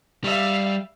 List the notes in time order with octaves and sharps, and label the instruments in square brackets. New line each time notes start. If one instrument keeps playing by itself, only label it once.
[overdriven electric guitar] G3 [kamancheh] E5 F5